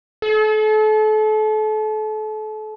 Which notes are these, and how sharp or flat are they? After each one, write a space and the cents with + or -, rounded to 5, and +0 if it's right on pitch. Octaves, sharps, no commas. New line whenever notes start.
A4 -35